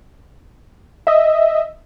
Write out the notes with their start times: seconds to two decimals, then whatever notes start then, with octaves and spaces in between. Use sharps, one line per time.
1.07 D#5 E5